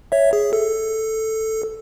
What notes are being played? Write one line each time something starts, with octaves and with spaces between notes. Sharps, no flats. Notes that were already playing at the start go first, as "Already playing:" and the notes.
C#5 E5
G#4
A4